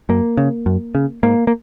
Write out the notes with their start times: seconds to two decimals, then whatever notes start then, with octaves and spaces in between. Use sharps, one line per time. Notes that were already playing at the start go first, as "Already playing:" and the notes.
0.09 F#2 A#3
0.37 C#3
0.66 F#2
0.95 C#3
1.23 G#2 A#3
1.47 A#3